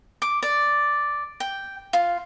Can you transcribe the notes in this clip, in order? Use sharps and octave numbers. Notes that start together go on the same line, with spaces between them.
D6
D5
G5
F4